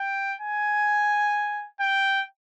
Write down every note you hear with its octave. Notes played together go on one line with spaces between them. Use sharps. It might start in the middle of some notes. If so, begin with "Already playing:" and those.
Already playing: G5
G#5
G5